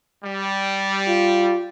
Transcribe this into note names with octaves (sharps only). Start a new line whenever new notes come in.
G3
F4